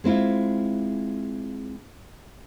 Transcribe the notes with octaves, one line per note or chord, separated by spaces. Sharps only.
G#3 C4 E4 F4